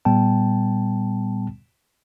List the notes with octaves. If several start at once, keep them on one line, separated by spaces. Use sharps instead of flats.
A#2 G3 B3 G5 A5